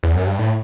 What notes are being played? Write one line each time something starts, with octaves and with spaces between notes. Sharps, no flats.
E2
F#2
G2
A2